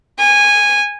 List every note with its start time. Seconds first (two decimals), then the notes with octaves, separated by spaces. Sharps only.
0.19 G#5